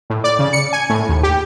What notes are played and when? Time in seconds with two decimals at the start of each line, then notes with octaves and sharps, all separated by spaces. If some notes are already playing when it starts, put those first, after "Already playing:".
0.10 A2
0.24 D5
0.39 C#3
0.53 C#7
0.73 G#5
0.90 A2
1.09 D#2
1.23 G4